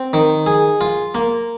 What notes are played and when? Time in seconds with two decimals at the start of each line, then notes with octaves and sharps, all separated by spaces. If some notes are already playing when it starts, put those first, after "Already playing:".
Already playing: C4
0.13 D#3
0.46 G#4
0.81 F4
1.15 A#3